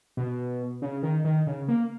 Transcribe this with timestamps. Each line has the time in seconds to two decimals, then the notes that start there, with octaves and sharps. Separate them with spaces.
0.17 B2
0.82 C#3
1.03 D#3
1.25 D#3
1.47 C#3
1.68 A#3